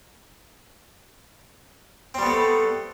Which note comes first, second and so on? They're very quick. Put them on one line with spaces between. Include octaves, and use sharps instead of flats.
C4 G3 B3 A3